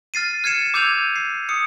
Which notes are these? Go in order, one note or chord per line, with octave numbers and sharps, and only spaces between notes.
F6 A6 C7 D#7
F6 G#6 C7 C#7 E7
D6 E6 G6 G#6 D#7 F7
C7
D#6 C#7